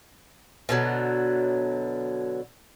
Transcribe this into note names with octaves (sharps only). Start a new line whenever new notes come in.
B2 D3 F#3